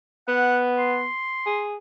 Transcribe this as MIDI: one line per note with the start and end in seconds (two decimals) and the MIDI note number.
0.28 1.08 59
0.28 0.58 78
0.78 1.63 84
1.46 1.76 68